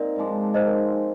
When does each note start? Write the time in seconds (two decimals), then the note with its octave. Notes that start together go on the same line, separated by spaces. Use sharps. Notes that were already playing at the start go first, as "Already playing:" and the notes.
Already playing: A#3 C4 D#4 A#4 D5
0.16 G#2 F3 G#3 D4
0.54 F3 C4 D#4 C5 D#5
0.67 A#4